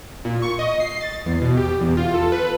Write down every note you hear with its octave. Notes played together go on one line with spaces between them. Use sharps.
A#2
C#6
D#5
C7
A6
E2
B2
G4
E2
F4
A4
B4